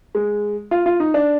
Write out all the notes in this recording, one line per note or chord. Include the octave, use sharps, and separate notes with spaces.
G#3
F4
F4
D#4
D4